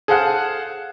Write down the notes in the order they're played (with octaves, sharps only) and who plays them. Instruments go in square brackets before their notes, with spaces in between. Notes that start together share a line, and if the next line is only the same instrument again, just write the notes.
[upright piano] G#4 A4 C5 F5 F#5